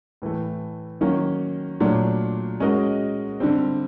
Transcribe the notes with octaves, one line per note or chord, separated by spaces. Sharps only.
A2 E3 A3
D#3 F#3 A#3 C#4
A#2 F#3 A3 D4
G#3 C#4 F#4 A#4 D#5
D3 G3 C4